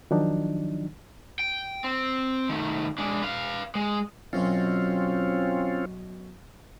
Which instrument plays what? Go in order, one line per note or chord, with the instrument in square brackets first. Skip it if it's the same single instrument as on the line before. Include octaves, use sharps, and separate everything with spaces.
[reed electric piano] D#3 F3 F#3 D4 D#4
[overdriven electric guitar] G5
C4
D#3 A3
G#3 D4
B4 F5
G#3
[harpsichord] B1 F#2 B2 [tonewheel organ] C4 C#4 F4